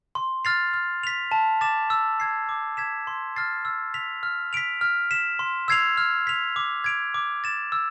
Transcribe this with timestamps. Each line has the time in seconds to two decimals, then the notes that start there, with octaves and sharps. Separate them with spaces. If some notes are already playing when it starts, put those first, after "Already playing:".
0.15 C6
0.45 F6 A6 C7 F7
0.73 F6
1.03 B6 F7
1.32 A5
1.61 D6 A6 E7
1.90 E6
2.20 G#6 C7
2.49 D6
2.77 G#6 B6 E7
3.07 C6
3.36 F6 A6 C7
3.65 E6
3.94 B6 F7
4.23 F6
4.53 B6 D7 F7
4.81 F6
5.11 B6 E7
5.39 C6
5.68 E6 G#6 C7 F7
5.97 F6
6.27 B6 F7
6.56 D6
6.84 G#6 D7 F7
7.14 D6
7.44 A6 E7
7.72 E6